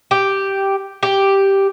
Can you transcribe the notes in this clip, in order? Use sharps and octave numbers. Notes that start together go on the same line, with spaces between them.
G4
G4